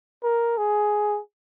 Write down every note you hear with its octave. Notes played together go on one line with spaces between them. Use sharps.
A#4
G#4